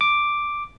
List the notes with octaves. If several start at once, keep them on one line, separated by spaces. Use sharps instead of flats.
D6